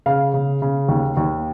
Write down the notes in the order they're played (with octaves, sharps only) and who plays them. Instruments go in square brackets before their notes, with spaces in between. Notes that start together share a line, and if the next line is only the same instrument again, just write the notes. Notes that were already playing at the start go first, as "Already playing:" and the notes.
[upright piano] C#3 F5
C#3
C#3
D#2
D#2